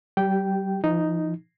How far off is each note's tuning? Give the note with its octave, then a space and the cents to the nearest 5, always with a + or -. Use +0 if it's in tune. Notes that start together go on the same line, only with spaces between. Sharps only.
G3 -40 G4 +0 G5 -10
F3 -40 D#4 +0